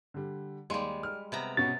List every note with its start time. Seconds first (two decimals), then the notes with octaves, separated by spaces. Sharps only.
0.14 D3 G3
0.70 D#2 G3 G#3 C6
1.03 F6
1.32 C3 B3 A#5
1.57 B2 C#4 F#5 A6